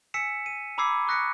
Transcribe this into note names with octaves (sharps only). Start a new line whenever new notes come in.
G#5 E6 B6 C#7 E7
D#7
A#5 B5 D6 E6 G#6 C7
C#6 D#6 F#6 A#6 B6 C#7